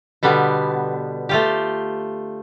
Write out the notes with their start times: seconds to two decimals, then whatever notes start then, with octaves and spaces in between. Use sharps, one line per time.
0.23 B2 D3 G3 B3
1.29 A3 F4 G4